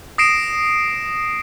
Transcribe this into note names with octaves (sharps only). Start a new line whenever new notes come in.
D#6 A#6 C7 D7 E7